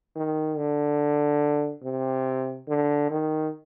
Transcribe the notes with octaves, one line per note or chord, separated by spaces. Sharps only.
D#3
D3
C3
D3
D#3